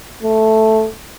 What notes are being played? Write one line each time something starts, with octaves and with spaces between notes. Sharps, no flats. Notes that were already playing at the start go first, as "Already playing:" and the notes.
A3